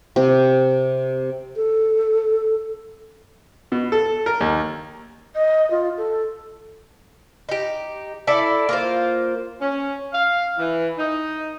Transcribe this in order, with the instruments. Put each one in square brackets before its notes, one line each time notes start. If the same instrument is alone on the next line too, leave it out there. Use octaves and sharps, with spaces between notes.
[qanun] C3 G4
[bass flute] A4
[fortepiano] B2
A4
A#4
D#2
[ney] D#5
F4
A4
[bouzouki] D#4 G4
E4 A4 D5
A#3 F4 C5
[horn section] C#4
F5
E3
D#4